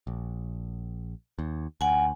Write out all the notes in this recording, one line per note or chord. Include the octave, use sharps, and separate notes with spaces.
A#1
D#2
D2 F#5 G#5